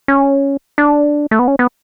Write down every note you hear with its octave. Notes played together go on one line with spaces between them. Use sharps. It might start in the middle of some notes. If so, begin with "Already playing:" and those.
C#4
D4
A3
B3
C#4
B3